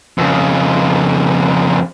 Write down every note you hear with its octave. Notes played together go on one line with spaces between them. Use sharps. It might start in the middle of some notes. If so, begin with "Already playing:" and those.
F2 C#3